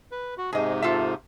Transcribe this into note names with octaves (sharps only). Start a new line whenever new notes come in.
B4
F#4
G#2 C3 G#4 D#5
F4 A4 E5